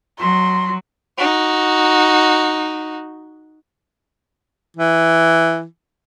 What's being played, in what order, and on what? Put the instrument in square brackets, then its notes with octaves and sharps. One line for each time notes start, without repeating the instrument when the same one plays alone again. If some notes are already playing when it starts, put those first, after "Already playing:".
[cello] F#3 [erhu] C6
[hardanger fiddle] D#4 F#4
[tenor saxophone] E3